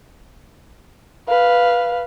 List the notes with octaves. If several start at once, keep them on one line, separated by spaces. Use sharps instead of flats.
B4 F5